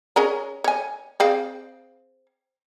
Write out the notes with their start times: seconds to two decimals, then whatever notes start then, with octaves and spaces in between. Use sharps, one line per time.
0.16 C#4 G#4 A#4
0.64 C#5 G#5
1.20 C4 G#4 F5